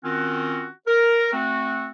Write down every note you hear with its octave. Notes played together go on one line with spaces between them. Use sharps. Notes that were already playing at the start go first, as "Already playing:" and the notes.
D#3 C4 C#4 F4 F#4
A#4
A3 C4 F#4